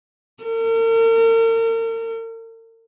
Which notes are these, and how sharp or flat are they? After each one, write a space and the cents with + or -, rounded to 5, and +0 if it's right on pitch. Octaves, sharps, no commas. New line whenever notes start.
A#4 -40